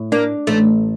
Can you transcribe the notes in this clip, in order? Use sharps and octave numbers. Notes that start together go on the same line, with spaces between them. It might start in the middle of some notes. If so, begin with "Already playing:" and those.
Already playing: A2
A#3 D4
A1 A3